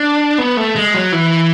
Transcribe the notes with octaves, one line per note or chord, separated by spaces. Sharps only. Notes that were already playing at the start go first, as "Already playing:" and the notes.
Already playing: D4
B3
A3
G#3
F#3
E3